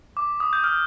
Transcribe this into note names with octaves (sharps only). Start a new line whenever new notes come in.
D6
D#6
G6
F6